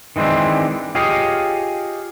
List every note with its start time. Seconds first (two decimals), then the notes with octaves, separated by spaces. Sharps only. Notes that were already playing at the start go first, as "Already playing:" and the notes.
0.16 D#3 E3 G#3 C4 D4
0.95 F4 G4 G#4 C#5 D#5 F5